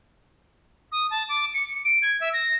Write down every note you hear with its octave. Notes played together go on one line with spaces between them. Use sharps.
D#6
A5
D6
C#7
D7
G#6
E5
A#6